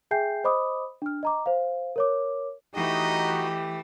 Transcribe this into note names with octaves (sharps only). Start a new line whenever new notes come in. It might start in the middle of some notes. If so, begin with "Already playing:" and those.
G#4 E5 G5 G#5 G6 C7
C5 D#5 B5 D6 D#6
D4 F6
D#5 A#5 D6
C5 F5
A#4 C#5 D6
E3 A3 D#4 F#4 G4 D#5